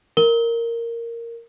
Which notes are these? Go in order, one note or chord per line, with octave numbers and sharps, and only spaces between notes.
A#4 G7